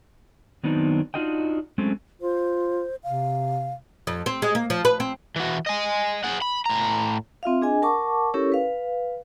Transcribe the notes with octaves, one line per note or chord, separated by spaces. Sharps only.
D#3 F#3 B3 C4 D4 D#4
D4 D#4 F4 F#4 D#5 G5
F#3 G#3 A3 C4 C#4
F4 C5
C3 F5
F2
C4
G#3
A#3
F3
B4
C4
E3 F#4
D#5 G#5
G#4 F#5
B5
A2 A#5
C4 F4 E5 F5
D4 G#4 D#5 G#5
A#4 F#5 A5 C#6 D6
C#4 E4 G4 A4 A#4 C#5
B4 F5